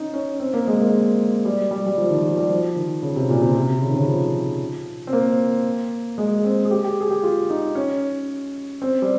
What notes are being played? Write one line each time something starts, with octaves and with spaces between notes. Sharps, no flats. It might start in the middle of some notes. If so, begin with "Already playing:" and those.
Already playing: C#4 D#4
C#4
C4
A#3
G#3
A#3
G3
G3
G3
F3
D#3
F3
G3
F3
D#3
C#3
C3
A#2
C3
C3
C#3
D#3
C#3
F3
C4
A#3
G#3
C4
G#4
G4
G4
G#4
G4
F4
D#4
C#4
C4
G3